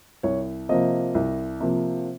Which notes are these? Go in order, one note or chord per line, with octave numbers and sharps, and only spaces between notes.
C2 C#5
C3 F3 A#3 D#5
C2
C3 F3 A#3